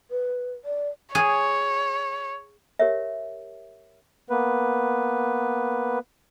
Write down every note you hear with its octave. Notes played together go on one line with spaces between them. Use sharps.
B4
D5
G#4 C#5
G4 A#4 C#5 E5
A#3 B3 B4